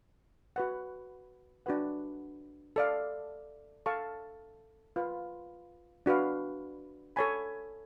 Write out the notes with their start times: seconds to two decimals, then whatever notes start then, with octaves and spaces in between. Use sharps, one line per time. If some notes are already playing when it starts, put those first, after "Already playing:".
0.56 F#4 B4 F#5
1.66 D4 F#4 B4 F#5
2.76 A4 D5 F5
3.86 A4 F5 A5 C#6
4.96 F4 B4 F5
6.06 D4 F#4 B4 F5
7.16 A4 C#5 G#5 B5